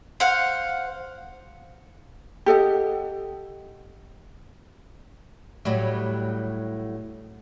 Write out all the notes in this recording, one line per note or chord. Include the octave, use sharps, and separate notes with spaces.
C5 F5 F#5 F6
G4 A4 D#5 F#5
A2 F#3 G3